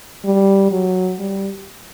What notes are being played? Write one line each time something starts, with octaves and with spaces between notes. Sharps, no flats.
G3
F#3
G3